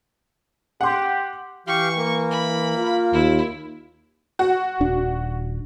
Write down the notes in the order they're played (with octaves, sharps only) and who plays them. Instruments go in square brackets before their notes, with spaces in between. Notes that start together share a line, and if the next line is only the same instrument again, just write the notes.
[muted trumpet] G4 [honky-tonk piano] F#5 C6
[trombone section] E3 [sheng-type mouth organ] G4 F5 [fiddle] C#6
[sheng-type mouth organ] A#3
[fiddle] B5
[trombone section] F4
[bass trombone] D#2 [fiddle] E4
[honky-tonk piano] F#4
[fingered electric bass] D#1 D4